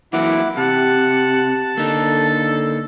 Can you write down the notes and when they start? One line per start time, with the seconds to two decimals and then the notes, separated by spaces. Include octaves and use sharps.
0.13 E3 F#3 A#3 E4 F#5 D6
0.57 C3 G4 F#5 A5
1.77 D3 A#3 D#4 A4